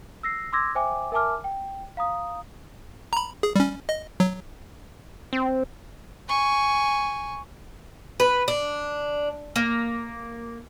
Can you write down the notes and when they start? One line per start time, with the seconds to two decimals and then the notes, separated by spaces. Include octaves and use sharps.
0.23 E6 A#6 C7
0.53 C6 D6 E6 G#6 A#6
0.75 C5 E5 G5 G#5 D6
1.12 A#4 E5 G#5 A5 D6 F6
1.44 G5
1.97 F5 A#5 D#6
3.13 A#5 B5
3.43 G#4
3.56 G3 C#4
3.89 D#5
4.20 F#3
5.33 C4
6.28 G#5 C#6
8.20 B4
8.48 D4
9.56 A#3